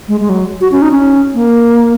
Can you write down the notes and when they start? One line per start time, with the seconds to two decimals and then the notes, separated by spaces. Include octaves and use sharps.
0.08 G#3
0.20 G#3
0.29 F#3
0.61 F#4
0.72 C#4
0.82 D#4
0.92 C#4
1.34 A#3